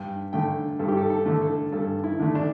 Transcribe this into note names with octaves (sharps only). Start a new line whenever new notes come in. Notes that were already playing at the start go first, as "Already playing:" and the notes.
Already playing: G2 G5
D3 A3 G5
G2 A4
G4
A4
A4
D3 A3
A4
G2 A4
E4
D3 A3
D4